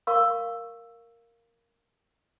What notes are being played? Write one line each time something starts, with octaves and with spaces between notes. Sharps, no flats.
A#4 F5 C#6 E6